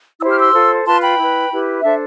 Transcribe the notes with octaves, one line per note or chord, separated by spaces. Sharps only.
E4 G4 C5 E6
F6
C6 E6
F4 A4 C5
F4 B4 A5 C6
G5 B5
E4 B4
E4 G4 B4
D4 A4 C5 E5